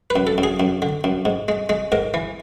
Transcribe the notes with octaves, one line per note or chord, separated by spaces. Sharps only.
B4
F#2
A4
F#2
G#4
F#2
D3
F#2
G#2
G#3
G#3
G#2 A#4
E3